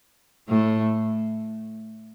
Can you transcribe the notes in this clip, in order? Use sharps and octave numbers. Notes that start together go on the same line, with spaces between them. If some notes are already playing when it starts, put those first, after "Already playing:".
A2 A3